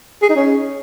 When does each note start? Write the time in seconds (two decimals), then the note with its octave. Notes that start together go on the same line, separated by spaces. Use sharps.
0.22 G#4
0.29 D#4
0.36 C#4